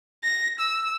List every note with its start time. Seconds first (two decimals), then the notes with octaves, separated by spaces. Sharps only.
0.23 A#6
0.60 E6